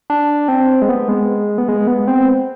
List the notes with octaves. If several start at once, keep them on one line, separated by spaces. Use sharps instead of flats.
D4
C4
G#3
B3
G#3
B3
G#3
B3
C4